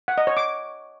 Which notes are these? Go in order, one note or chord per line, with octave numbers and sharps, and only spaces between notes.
F#5
D#5
C#5
D6